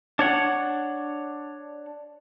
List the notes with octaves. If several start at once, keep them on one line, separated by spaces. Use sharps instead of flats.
D4 C#5 F#5